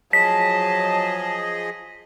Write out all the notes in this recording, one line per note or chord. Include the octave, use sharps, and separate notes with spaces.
F3 F#3 G#4 D#5 A5 B6